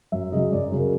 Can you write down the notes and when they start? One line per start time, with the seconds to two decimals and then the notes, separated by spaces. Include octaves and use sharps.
0.12 F#2 E5
0.32 C#3 F#3 D#5
0.52 F#2 D5
0.72 C#3 F#3
0.79 A#4